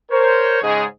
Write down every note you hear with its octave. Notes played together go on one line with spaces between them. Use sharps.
A#4 C5 C#5
G#2 C#3 G#3 G#4